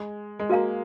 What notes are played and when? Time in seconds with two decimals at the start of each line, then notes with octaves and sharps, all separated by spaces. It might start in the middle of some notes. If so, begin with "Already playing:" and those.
Already playing: G#3
0.39 G#3
0.49 A#3 F#4 A#4 F5 A#5